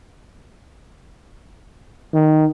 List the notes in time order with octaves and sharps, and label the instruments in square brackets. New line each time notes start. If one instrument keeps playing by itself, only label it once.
[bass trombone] D#3